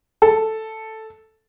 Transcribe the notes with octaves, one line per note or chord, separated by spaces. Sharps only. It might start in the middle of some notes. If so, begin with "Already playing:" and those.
A4